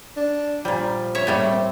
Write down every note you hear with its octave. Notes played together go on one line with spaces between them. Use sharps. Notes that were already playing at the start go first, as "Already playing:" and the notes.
D4
A#2 F3 G3
C#5 E5
A2 G3 A3 A#3
C4